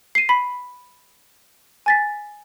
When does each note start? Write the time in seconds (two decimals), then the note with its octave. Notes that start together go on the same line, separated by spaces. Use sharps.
0.15 C7 D#7
0.29 B5 B6
1.86 G#5 A6 B6